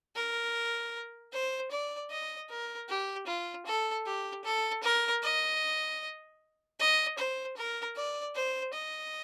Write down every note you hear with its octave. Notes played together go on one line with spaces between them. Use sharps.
A#4
C5
D5
D#5
A#4
G4
F4
A4
G4
A4
A#4
D#5
D#5
C5
A#4
D5
C5
D#5